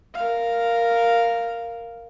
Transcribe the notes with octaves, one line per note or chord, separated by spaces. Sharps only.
A#4 F5